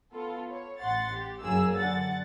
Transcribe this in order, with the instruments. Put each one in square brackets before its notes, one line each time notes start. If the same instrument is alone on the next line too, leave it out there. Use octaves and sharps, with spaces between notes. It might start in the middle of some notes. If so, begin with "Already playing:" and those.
[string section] B3 F4 A4
C#5
A1 F#5 C6 A6
G4
F#2 C#3 A#3 G#4 E6
D3 F#5 A6